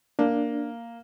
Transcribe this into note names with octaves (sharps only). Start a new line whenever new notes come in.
A#3 D4